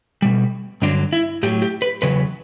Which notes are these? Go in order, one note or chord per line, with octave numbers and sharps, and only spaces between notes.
B2 G3
G2 D3 F#3 D4
E4
A2 F#3 G4
G4
B4
E2 C#3 F#3 B4